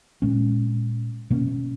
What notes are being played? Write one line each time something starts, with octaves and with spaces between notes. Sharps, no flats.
A#2 G#3 C#4
B2 A#3 C#4